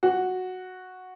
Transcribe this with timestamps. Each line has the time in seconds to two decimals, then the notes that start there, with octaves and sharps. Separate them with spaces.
0.03 F#4